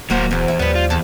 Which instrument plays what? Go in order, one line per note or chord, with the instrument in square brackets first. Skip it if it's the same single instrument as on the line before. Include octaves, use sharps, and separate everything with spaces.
[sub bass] D#1 [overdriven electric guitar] F#3 C5 [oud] A#3 F#4
[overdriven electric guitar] E2 [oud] F#3 C5
[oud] E4
[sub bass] D#2 [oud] F3 G3 [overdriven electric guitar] B3 B4
[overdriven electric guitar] F4
[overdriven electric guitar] E2 [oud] A4